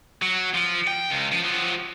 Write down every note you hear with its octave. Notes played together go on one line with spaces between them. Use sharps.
F#3
F3
G5
C#2
F3
F3 F#3